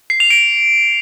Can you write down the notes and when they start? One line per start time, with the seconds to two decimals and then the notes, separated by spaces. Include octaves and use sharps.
0.10 C7
0.20 F7
0.30 D7